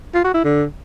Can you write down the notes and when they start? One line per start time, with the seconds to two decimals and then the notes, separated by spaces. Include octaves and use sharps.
0.14 F4
0.24 F#4
0.34 E4
0.44 D3